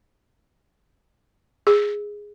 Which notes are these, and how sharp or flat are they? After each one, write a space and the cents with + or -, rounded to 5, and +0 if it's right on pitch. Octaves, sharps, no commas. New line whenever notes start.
G#4 -5